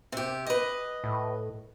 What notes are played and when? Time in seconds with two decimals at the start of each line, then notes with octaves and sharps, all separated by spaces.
0.12 C3 G4
0.46 B4 D#5
1.04 A2